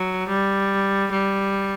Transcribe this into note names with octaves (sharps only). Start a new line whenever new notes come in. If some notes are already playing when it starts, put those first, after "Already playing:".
Already playing: F#3
G3
G3